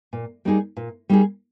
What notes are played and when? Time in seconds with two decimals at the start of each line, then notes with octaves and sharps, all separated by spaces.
0.13 A#2
0.45 G3 A#3 D#4 G#4
0.77 A#2
1.09 G3 A#3 D#4 G#4